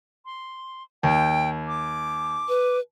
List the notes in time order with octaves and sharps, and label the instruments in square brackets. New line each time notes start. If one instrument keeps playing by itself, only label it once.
[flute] C6
[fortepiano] D#2 [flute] G5
[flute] D6
[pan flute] B4